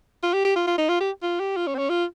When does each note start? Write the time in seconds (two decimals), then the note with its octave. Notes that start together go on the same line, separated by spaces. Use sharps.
0.23 F4
0.34 G4
0.45 G4
0.56 F4
0.67 F4
0.78 D#4
0.89 F4
1.00 G4
1.22 F4
1.40 G4
1.56 F4
1.67 C#4
1.75 C4
1.78 C#4
1.89 F4